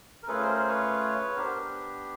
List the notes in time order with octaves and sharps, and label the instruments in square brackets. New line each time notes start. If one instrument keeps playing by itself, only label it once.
[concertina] A#4
A3 C#4 F4 G#4 A4 B4
A#4 C5
A#4 C5
B4 C#5
B3 D4 G4 A#4 C5
A#4